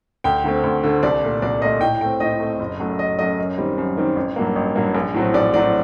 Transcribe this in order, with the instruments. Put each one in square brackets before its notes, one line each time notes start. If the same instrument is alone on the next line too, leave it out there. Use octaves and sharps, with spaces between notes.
[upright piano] D2 G5
D3 A3 C4
D2
D3 A3 C4
C2 D5
A#2 A3
C2 D5
A#2 A3 D#5
A2 G5
A3 C4 G5
A2 D#5
A3 C4
F#1
F#2 F#3 A3
F#1 D#5
F#2 F#3 A3 D#5
F#2
D#3 G3 C4
F#2
D#3 G3 C4
A1
G2 F#3 A#3
A1
G2 F#3 A#3
A#1
A2 F#3 C4
A#1 D5
A2 F#3 C4 D5